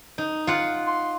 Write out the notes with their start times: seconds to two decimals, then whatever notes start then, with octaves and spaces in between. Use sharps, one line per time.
0.18 D#4
0.47 F4 F#5
0.87 C6